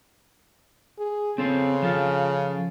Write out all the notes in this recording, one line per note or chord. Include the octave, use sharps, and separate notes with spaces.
G#4
C#3 C4 A4 C5
F3 F4 A4